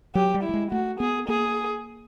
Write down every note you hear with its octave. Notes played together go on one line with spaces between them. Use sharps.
F#3 G4
G3
E4
G3
G#3
A3 F#4
B3 G#4
A#3 G#4